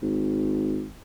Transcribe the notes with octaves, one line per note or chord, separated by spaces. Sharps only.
G#1